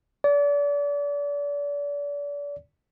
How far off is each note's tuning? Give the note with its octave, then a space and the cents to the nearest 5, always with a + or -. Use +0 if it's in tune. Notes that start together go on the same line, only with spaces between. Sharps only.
D5 -35